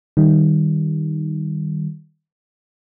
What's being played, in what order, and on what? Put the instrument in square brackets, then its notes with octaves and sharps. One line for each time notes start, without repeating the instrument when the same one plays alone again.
[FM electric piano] D#3 G3